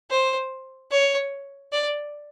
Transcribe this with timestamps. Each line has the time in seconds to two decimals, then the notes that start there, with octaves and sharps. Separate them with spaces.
0.10 C5
0.91 C#5
1.73 D5